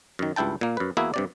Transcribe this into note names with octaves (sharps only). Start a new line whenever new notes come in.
F#2 D#3
C#2 G2 E4 G5 A5
A#2 A#3
F#2 B4
E2 A#3 E4 F#4 G#4 E5
G2 C3 D5